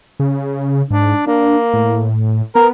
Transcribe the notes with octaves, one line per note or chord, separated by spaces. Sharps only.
C#3
G#2 D4
A#3 D4
A2
B3 A#4